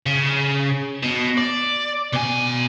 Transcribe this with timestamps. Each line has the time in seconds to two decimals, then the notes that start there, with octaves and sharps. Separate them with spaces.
0.06 C#3
1.03 B2
1.38 D5
2.13 B2 G#5